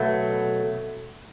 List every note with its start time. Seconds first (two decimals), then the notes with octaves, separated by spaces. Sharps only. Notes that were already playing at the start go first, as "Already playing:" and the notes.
Already playing: B2 F#3 A3